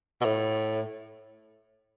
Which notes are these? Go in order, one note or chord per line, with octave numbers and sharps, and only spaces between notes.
B2
A2